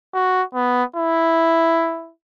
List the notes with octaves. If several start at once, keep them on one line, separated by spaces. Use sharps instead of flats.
F#4
B3
E4